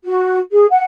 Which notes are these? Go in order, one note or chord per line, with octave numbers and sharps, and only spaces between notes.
F#4
G#4
F#5